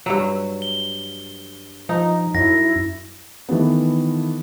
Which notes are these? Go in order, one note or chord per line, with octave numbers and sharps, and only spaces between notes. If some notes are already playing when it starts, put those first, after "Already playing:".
G2 F#3
G7
F3 D#4 D#5
F#2 E4 A#6
D#3 E3 A3 B3